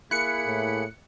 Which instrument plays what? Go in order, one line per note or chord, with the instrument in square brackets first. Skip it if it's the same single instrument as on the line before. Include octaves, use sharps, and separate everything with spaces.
[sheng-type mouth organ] A#3 G#4 B5 [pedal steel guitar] E4 [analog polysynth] F#6 C#7
[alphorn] A2